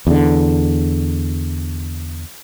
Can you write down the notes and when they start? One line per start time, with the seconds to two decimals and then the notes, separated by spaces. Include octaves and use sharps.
0.07 E2 D3